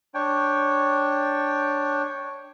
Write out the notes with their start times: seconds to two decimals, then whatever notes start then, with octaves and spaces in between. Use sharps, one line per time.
0.14 D4 C#5 G5